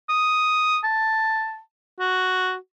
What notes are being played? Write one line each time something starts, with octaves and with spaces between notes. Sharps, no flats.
D#6
A5
F#4